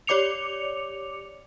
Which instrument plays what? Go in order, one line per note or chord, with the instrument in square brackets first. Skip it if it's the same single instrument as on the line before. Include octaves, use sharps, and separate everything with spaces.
[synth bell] G4 C#5 D5 D6 C#7 F7